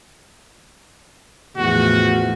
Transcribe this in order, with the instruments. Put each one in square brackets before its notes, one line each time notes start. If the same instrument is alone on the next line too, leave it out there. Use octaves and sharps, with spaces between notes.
[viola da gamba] E2 A2 F3 [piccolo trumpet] F#4